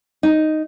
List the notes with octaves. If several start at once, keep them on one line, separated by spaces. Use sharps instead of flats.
D#4